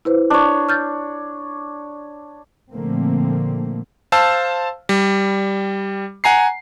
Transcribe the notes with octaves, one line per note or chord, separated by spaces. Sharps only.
E4 B4 C5
D4 C#5
F6 G6 A6
A#2 D3 F3 A3 A#3 C4
C5 F5 A5 E6
G3
F#5 G#5 A#5 C7